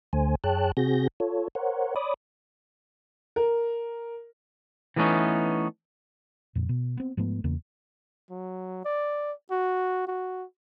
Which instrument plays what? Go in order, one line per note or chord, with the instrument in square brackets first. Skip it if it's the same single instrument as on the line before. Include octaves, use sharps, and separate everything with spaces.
[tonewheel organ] D2 D3 A3 C5 G#5
F#2 G#4 C#5 G5 A5 F#6
C3 C4 F#4 G#4 G6 A#6
F4 A4 C#5
A#4 C5 C#5 F#5
C#5 D5 B5 D6 D#6
[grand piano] A#4
[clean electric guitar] E3 G3 A3 B3 C#4 D#4
[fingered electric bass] F2 A#2
B2
B3 C4
G#2 F3 A3 B3
E2 C#3 A#3
[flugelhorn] F#3
D5
F#4
F#4